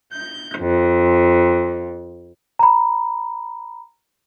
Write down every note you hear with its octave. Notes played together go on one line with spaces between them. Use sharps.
G6
F2
A#5 B5